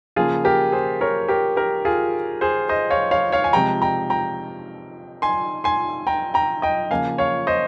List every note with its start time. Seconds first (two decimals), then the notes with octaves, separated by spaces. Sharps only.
0.16 C#3 F3 A#3 F4 G#4
0.45 G4 A#4
0.72 G#4 C5
1.01 A#4 C#5
1.28 G4 A#4
1.57 G4 A#4
1.85 F4 G#4
2.41 G#4 C5
2.69 C5 D#5
2.90 C#5 F5
3.11 C#5 F5
3.32 C#5 F5
3.44 G#5
3.53 C3 F3 G#3 G5 A#5
3.82 G5 A#5
4.10 G5 A#5
5.22 G#5 C6
5.64 G#5 C6
6.07 G5 A#5
6.34 G5 A#5
6.62 D#5 G5
6.91 C#3 F3 A#3 F5 G#5
7.18 C#5 F5
7.47 C5 D#5